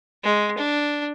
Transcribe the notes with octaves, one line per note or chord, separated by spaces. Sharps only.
G#3
D4